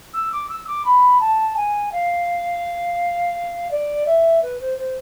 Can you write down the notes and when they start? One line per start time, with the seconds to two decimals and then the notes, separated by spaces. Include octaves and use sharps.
0.13 E6
0.32 D6
0.49 E6
0.67 D6
0.85 B5
1.20 A5
1.56 G#5
1.92 F5
3.71 D5
4.06 E5
4.42 B4
4.60 C5
4.77 C5